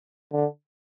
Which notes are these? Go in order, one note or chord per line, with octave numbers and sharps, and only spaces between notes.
D3